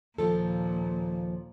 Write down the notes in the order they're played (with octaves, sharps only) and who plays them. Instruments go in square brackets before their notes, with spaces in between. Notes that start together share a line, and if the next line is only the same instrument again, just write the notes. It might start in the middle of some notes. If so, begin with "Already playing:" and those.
[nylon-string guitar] D#2 F3 A4 [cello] A#2